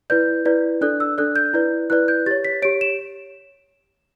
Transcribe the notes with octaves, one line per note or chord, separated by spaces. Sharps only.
E4 B4 D5 G6
E4 B4 D5
D4 A4 D5 F#6
E6
D4 A4 D5 F#6
G6
E4 B4 D5
E4 B4 D5 F#6
G6
G4 C#5 A6
B6
G4 C#5 D7
E7